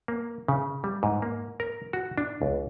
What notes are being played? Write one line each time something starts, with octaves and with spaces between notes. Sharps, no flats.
A#3
C#3
G3
G#2
A#3
A#4
F#4
D4
C#2